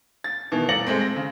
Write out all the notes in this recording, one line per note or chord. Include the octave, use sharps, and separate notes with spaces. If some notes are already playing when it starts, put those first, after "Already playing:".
A6
B2 D#3 E3
D#1 A3 D5 A#6 C#7 F#7
G#3 A3 C4
A#6
C#3